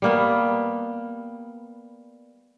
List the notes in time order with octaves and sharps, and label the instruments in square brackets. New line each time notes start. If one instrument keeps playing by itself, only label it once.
[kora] G3 A#3 B3